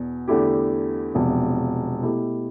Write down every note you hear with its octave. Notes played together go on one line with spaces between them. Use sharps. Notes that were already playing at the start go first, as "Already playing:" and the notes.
Already playing: E2 B2
E2 D3 A3 E4 G4
E1 E2 C3 F3
B2 A3 E4 G4